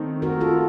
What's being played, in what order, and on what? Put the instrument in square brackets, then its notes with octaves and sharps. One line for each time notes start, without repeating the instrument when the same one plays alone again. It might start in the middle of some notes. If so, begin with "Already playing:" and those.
Already playing: [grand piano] D#3 A3 C4 D#4
[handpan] F#4 A#4
F4 A4